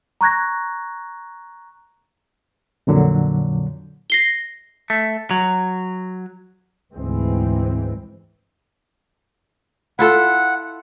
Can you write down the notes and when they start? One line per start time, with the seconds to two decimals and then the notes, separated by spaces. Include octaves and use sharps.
0.21 A#5 C#6 F#6 G#6 A#6
2.87 F2 A#2 D3 F#3
4.10 A#6 C7 G7
4.90 A3
5.31 F#3
6.94 D2 G#2 E3 G#3 C4
9.99 E4 F4 A4 F#5